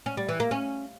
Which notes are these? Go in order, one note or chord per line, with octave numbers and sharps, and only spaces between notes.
C#4
G3
E3
A#3
C#4